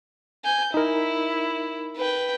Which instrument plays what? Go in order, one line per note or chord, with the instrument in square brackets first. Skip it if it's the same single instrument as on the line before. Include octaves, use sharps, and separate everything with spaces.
[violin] G#5 G6
[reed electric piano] D#4 A#4 [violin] E4
[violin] B4 G5